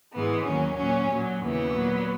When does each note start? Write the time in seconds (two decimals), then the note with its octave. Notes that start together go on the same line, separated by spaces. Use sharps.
0.12 G#2 E3 G#3 B3
0.45 D#2 D#3 F#3 C#4
0.77 A#2 F#3 C#4
1.09 A#2 F#3
1.41 D#2 C#3 E3 B3
1.73 A#2 F#3